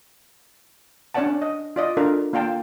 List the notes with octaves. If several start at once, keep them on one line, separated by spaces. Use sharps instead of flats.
C#4 D4 C#5 D5 F#5 A5
D#5
F4 D5 D#5
D4 F4 A4 A#4
A#3 F4 F5 G5 A5